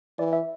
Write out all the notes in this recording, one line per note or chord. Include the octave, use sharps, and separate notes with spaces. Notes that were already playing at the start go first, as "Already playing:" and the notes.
E3 D5
E5